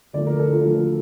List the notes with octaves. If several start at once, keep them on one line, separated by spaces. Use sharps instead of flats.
D2 D3 F3 A3 D5
A#4
A4
F4
D2 D3 F3 A3